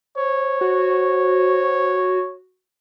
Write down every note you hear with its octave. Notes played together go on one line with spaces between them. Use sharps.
C5 C#5
F#4